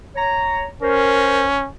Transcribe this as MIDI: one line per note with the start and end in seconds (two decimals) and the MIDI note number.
0.16 0.63 73
0.16 0.63 82
0.82 1.69 61
0.82 1.45 70
0.82 1.45 72